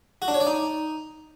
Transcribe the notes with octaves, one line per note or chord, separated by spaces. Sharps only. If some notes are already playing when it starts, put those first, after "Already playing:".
F#4
D4
C#5
D5
D#4